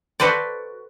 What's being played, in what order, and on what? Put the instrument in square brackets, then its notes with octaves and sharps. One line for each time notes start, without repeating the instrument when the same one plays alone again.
[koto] F#4 A4 B4 C5 D5